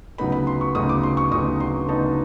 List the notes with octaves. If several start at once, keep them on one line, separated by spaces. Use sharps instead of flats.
D2 C#3 F#3 B3 D#4 B5
B5
C6
C#6
D2 C#3 F#3 B3 D#4 D#6
D6
C6
C#6
D2 C#3 F#3 B3 D#4 D#6
C6
D2 C#3 F#3 B3 D#4 A5